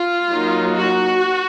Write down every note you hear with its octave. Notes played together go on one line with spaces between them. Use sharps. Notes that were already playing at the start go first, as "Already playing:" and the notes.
Already playing: F4
F#3 A#3 D#4
F#4